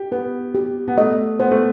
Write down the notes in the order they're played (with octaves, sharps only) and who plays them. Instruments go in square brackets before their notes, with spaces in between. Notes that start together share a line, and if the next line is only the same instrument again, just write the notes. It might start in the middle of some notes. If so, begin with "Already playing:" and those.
Already playing: [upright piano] G4
[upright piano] B3 [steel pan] B4
[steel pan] G4
[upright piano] B3
[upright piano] A3 [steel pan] D#5
[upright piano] B3 [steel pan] C5
[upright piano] A3